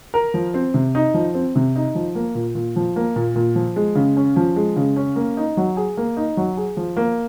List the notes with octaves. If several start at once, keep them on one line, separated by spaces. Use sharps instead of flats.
A#4
F3
C4
C3
D#4
F3
C4
C3
D#4
F3
A#3
A#2
A#2
F3
A#3
A#2
A#2
F3
G#3
C#3
C#4
F3
G#3
C#3
C#4
A#3
D#4
F#3
G#4
A#3
D#4
F#3
G#4
F3
A#3